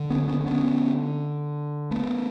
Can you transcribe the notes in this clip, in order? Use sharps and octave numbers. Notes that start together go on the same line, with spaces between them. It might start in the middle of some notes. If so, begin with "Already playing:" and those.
Already playing: D3
B3 C#4
B3 C#4
B3 C#4
A3 B3